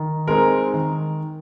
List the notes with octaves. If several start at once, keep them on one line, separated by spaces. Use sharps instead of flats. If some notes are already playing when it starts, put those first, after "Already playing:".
Already playing: D#3
G#3 C4 D#4 A#4
D#3